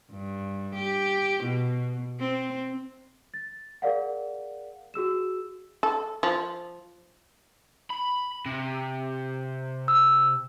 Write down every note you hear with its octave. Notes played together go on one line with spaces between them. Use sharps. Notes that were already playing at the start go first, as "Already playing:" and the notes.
G2
G4
B2
C4
A6
G#4 A#4 D5 F5 F#5
F#4 G#4 E6 E7
A4
F3
B5
C3
E6